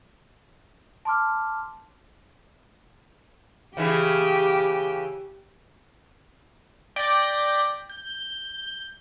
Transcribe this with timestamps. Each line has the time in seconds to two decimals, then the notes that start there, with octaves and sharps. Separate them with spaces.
1.05 A5 C6 D6 F6
3.77 C#3 E3 E4 G4
6.96 D5 G5 A#6 B6
7.89 G6